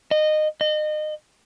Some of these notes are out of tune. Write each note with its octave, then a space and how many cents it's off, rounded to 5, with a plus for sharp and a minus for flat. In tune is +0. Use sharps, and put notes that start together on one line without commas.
D#5 -20
D#5 -30